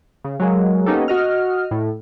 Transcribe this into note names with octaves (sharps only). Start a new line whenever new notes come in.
C#3
F#3 G#3 A#3
A#3 B3 C#4 D#4 G4 A4
F#4 D#5 F6
A2